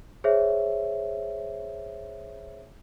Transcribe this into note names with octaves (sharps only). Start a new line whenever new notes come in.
G#4 C5 C#5 E5